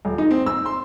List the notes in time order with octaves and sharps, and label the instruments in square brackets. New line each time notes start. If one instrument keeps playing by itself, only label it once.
[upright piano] D#1
D#4
C4
E6
C6